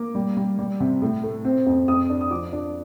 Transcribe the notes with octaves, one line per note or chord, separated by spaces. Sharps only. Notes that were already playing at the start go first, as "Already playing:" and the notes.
Already playing: A#3 D6
G3
G3
G3
C3
A2
A3
C4
F2
F2 D#6
D4
D#6
F3 D6
D4